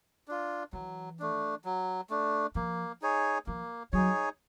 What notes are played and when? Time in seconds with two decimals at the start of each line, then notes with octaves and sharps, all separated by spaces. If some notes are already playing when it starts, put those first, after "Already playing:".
0.28 D4 F4
0.73 E3 F#3
1.19 A3 D4
1.65 F#3
2.10 A3 D4
2.55 F3 A#3
3.02 D#4 G#4 C#5
3.47 F3 A#3
3.92 F#3 D#4 G#4 C#5